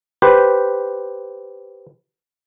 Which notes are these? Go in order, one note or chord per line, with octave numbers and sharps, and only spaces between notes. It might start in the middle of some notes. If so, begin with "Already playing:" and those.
G4 B4 C5